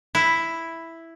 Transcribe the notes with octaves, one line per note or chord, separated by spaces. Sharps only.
E4